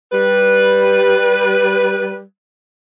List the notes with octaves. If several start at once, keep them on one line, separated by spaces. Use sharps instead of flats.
G3 B4